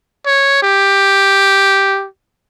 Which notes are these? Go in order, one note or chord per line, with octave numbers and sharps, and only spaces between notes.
C#5
G4